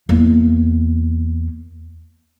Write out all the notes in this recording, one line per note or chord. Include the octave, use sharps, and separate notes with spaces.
E2 A#3